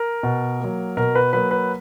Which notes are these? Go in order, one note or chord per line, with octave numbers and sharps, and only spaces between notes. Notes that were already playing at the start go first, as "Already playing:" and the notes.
Already playing: A#4
B2
F#3 A#3
B2 A#4
B4
F#3 A#3 B4
B4